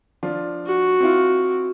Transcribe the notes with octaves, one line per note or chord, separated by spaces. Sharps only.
F3 D4 F4
F#4
C4 E4 F4